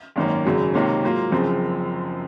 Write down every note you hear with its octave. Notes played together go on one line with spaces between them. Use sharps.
G#1 F#2 D#3 A#3 C#4
G#1 F#2 C#3 F#3
C#2 C3 D#3 A#3 C#4
G#2 F#3 A#3 F4
F#1 F#2 C#3 F3 C4